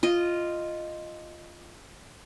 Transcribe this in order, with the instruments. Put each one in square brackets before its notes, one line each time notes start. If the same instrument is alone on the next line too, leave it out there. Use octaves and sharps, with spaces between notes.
[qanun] F4 D#5